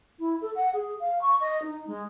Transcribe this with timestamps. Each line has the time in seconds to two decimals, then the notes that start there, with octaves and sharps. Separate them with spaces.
0.19 E4
0.41 A4
0.55 F#5
0.73 G#4
1.00 F5
1.21 C#6
1.40 D#5
1.62 D#4
1.87 G#3